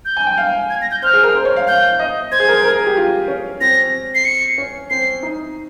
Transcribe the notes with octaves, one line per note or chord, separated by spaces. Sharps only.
G6
G#5
G5
F5
G#6
A#6
G6
C5 F6
G#4
A#4
C5
C#5
F5
F5 G6
D#5
C5 G#6
G#4
A#4
C5
A#4
G#4
G4
F4
C#4
C4 A#6
C7
C#7
C#4
C4 C7
D#4